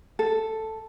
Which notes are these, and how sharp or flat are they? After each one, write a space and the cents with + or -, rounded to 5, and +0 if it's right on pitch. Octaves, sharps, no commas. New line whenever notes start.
A4 +5